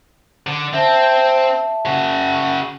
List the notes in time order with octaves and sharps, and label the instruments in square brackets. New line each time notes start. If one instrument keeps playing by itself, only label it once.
[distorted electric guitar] D3
[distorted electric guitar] C4 [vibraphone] E5 A5
[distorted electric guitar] C#3 F#4